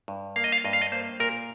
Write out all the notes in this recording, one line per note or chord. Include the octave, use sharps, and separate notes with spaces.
G2
A#3 F5
D#5
F5
G2 D#5
F5
D#5
A#3 C5
A#2 A#4